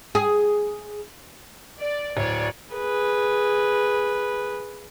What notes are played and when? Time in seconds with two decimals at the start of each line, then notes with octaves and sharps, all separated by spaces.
0.15 G#4
1.80 D5
2.17 D1 C#5 D5
2.74 G#4 B4